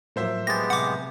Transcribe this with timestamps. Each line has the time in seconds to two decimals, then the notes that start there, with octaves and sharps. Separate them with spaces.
0.16 A2 F3 F#3 A#3 C5 E5
0.47 G#3 B3 G4 A6 A#6
0.70 C2 F#5 D6